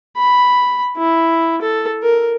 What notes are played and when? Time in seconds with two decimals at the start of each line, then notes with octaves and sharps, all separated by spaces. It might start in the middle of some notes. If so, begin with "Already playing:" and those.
0.17 B5
0.97 E4
1.61 A4
2.03 A#4